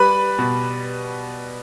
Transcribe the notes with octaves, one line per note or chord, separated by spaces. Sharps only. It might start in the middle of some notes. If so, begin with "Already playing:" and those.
Already playing: G3 B4 B5
B2